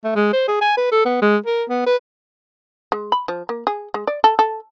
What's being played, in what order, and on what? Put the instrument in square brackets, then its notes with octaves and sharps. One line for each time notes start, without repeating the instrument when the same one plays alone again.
[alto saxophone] A3
G#3
C5
G#4
G#5
B4
A4
B3
G#3
A#4
B3
B4
[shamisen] G#3
B5
F3
A#3
G#4
G#3
D5
A4
A4